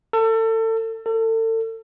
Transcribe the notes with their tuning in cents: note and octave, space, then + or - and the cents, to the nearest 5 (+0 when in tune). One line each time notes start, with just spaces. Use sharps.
A4 +30
A4 +35